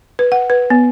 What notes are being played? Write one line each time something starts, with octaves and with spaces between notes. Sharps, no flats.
B4
F#5
B4
B3